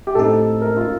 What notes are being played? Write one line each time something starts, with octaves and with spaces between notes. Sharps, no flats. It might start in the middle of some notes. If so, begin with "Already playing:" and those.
G4
A2 A3 C4 D#4 A4
A#4
F4